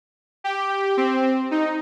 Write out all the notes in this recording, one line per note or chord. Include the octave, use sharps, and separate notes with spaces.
G4
C4
D#4